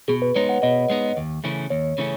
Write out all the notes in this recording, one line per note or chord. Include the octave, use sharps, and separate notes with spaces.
B2 G#4
B4
G#3 B3 D#4 C#5
F#5
B2 D#5
G#3 B3 D#4
D#2
C#3 E3 A3 C#4
D#2 C#5
C#3 E3 A3 C#4